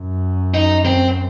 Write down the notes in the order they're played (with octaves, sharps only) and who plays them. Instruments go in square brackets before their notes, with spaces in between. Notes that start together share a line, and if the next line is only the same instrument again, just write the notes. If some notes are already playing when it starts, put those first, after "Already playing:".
Already playing: [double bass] F#2
[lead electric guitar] D#4
C4